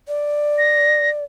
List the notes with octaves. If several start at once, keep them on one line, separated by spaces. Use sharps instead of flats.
D5
A#6